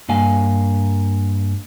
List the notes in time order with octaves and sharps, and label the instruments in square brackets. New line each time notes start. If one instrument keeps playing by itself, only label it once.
[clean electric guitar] G2 A#3 F5 G#5